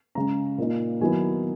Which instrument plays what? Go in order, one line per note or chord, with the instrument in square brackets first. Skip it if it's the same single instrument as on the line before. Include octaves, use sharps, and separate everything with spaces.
[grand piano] C#3 G#3 C#4 A#5
A#2 A#3 D#4
D#3 F#3 B3 E4 G#5